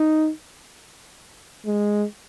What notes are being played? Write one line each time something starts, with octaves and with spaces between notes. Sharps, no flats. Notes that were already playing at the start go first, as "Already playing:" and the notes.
Already playing: D#4
G#3